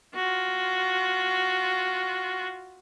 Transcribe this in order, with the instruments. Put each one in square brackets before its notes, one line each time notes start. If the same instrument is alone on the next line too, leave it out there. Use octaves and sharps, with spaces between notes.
[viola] F4 F#4